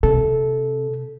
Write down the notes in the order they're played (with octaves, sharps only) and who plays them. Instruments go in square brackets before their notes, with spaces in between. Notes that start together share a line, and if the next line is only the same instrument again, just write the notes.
[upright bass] C3 [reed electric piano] A4